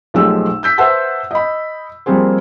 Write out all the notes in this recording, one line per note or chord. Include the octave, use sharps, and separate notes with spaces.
B1 F3 G#3 A3 G4 E6
E6 G6 B6
B4 C5 E5 F#5 A5 E6
D#5 B5
F3 G3 A#3 C4 G#4 C5